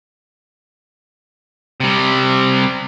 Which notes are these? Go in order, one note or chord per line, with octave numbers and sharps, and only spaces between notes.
C3 G3